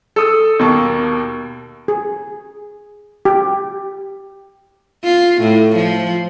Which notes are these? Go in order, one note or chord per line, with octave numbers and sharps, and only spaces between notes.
A4 D#6 E6
D#2 B2 A#3 A5 C#6
G#4
G4
F4
A2
F3